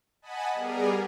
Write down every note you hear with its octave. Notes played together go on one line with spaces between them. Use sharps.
D#5 F#5 G#5 A5 B5
G3 B3 G#4 A#4